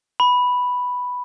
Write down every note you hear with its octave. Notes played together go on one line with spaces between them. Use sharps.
B5